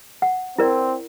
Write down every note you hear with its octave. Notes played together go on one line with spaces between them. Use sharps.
F#5
C4 E4 A#4 D5